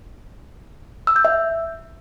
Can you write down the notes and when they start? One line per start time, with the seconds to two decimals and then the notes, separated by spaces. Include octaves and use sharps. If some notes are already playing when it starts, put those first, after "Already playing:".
1.07 E6
1.16 G6
1.25 E5